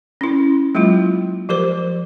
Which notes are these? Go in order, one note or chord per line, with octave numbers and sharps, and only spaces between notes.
C#4 E4
F#3 G#3 A#3 E4 F4
F3 G4 A#4 C5